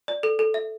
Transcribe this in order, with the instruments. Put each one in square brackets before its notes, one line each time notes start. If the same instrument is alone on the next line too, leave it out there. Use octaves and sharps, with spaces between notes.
[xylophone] D5
A4
A4
E5